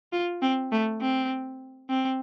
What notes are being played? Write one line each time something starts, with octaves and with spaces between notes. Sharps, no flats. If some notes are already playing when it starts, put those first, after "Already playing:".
F4
C4
A3
C4
C4